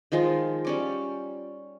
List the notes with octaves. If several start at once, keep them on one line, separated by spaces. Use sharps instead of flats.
D#3 F3 G#3 F4
G3 C#4 D6